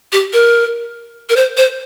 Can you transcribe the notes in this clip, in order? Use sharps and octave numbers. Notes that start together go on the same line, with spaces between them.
G4
A#4
A#4
C5
C5